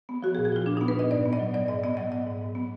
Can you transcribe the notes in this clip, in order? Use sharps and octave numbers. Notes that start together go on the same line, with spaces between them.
B3
F3 F#4
G#4
A#2
G#4
F3 F4
A#2 D4
D#4
B3
B4
A#2 D#5
G#2 D5
B3
D#5
F#3
F#3 D5
G#2 D#5
B3 D#5
F#3 D#5
B3 D#5
G#2
G#2
B3